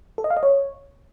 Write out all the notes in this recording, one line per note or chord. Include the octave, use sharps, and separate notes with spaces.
A4
D#5
F5
D#5
C#5